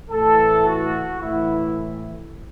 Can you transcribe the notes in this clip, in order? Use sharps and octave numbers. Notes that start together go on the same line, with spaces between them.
A2 E3 A4
F#4
A2 E3 E4